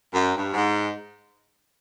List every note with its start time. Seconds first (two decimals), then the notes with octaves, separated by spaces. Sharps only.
0.14 F#2
0.34 G2
0.53 G#2